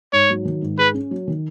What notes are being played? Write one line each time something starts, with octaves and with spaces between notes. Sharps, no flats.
G#2 C#5
F#3
D#3
G#2
G#4 B4
C#4
F#3
D#3